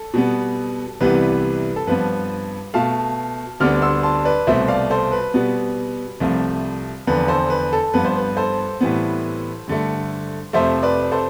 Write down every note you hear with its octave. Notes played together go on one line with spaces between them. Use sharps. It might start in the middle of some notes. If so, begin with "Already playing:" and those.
Already playing: A4
B2 G3 B3
C2 C3 E3 G3 B3 B4
A4
G2 F3 B3 B4
B2 A3 F5 A5
D2 D3 G3 B3 D6 F6
C6 E6
A5 C6
B4 D5
C2 B2 A3 C5 E5
D5 F5
A4 C5
B4
B2 G3 B3
C2 C3 F3 A3
E2 D3 F3 B4
A4 C5
B4
A4
G2 F3 B3 B4
C5
B4
A4 C5
A2 E3 G3 B3
G2 D3 A3
F2 C3 F3 A3 C5 E5
B4 D5
A4 C5